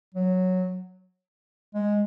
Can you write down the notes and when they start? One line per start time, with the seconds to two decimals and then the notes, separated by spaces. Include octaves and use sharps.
0.14 F#3
1.74 G#3